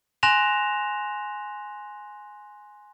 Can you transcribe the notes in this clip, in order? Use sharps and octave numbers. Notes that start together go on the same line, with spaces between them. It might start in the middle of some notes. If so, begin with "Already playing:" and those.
G#5 C6 F#6 A#6 E7 F7